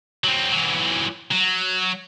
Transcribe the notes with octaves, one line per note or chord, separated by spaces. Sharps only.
F#3 C4
E3 F#3
F#3